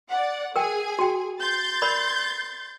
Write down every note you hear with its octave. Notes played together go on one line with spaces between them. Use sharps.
D5 F#5
G#4 A#4 G5 G#5
F#4 G5
C6 G6 A6
A#4 D5 B5